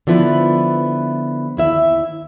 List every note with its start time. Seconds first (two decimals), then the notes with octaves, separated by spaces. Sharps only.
0.07 D3 F3 B3 E4 B4
1.57 D#2 E4 E5